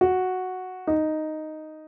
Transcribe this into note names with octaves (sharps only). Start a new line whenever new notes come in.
F#4
D#4